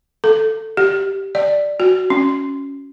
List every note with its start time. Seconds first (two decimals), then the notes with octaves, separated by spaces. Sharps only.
0.24 A4
0.77 G4
1.35 D5
1.80 F#4
2.10 C#4